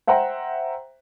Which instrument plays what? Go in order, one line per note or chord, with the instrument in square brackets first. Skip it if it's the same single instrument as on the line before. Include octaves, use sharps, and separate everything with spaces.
[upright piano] C5 E5 F#5 G5 A#5